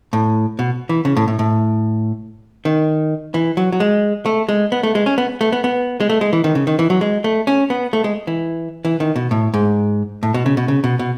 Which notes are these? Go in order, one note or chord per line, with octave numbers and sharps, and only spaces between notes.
A2
B2
E3
C#3
A2
A2
A2
D#3
E3
F#3
F#3
G#3
A3
G#3
B3
A3
G#3
C#4
B3
A3
B3
B3
G#3
A3
G#3
E3
D#3
C#3
D#3
E3
F#3
G#3
A3
C#4
B3
A3
G#3
E3
E3
D#3
B2
A2
G#2
A2
B2
C#3
B2
C#3
B2
B2